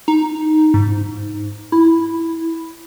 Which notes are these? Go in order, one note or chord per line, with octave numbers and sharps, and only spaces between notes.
D#4
G#2
E4